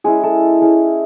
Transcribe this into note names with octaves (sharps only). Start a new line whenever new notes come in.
G#3 C#4 E4 G#4
A4
G#3 C#4 E4